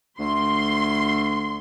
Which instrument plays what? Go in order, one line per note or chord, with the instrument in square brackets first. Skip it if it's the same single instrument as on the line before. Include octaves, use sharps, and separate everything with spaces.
[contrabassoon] D2 [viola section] C6